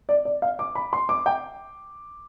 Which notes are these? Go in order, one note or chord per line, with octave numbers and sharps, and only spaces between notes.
D5
D5
F5
D6
B5
C6
D6
G5